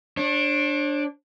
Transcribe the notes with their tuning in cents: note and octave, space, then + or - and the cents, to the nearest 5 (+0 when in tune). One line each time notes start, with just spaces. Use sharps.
D4 +0 C#5 -45